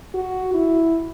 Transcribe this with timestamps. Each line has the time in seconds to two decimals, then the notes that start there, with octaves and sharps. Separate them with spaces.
0.14 F#4
0.54 E4